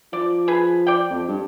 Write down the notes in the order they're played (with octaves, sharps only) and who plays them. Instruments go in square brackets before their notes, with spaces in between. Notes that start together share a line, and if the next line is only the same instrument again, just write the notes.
[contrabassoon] F3 [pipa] D5
[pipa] G#4 B4
D5 G5
[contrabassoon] F2
G2